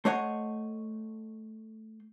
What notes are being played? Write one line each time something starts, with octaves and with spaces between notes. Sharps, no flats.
A3 C5 C#5 D#5 F#5